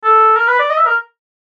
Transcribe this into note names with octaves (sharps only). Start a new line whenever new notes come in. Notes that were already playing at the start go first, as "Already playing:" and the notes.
A4
A#4
B4
D5
D#5
E5
A#4